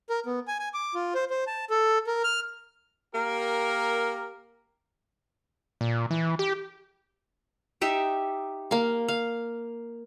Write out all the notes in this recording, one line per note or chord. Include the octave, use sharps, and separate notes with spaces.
A#4
B3
G#5
G#5
D6
F4
C5
C5
A5
A4
A#4
F6
A#3 G4 A#4
A#2
E3
G4
D#4 G4 E5
A#3 F5
F5